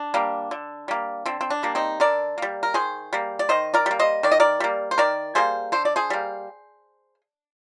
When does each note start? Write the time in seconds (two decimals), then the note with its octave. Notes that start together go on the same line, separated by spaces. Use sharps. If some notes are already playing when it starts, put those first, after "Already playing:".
Already playing: D4
0.14 G3 A#3
0.51 D3
0.88 G3 A#3
1.26 D3 C4
1.41 C4
1.50 D4
1.63 G3 A#3
1.75 C4 D#4
2.00 D3 A#4 D5
2.38 G3 A#3
2.63 A#4
2.74 D#3 G#4 C5
3.13 G3 A#3
3.39 D5
3.49 D#3 C5 D#5
3.74 A#4 D5
3.86 G3 A#3
3.99 C5 D#5
4.23 D#3 D5
4.32 D#5
4.40 A#4 D5
4.60 G3 A#3
4.91 C5
4.98 D#3 A#4 D5
5.35 G3 A#3 G#4 C5
5.72 D3 C5
5.85 D5
5.96 G#4 C5
6.10 G3 A#3